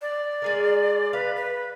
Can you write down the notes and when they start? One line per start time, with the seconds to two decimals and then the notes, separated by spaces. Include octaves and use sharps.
0.02 D5
0.42 G#3 G#4 A#4
1.13 B4 F5
1.36 B4